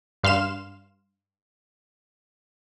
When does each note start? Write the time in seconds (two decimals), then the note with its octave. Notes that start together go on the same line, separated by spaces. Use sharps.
0.23 G2 F5 C6 F6 E7